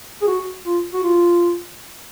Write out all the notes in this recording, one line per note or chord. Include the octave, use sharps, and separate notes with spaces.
G#4
F#4
F4
F#4
F4